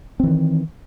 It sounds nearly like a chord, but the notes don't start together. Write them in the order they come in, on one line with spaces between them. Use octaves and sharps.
C4 E3 D#3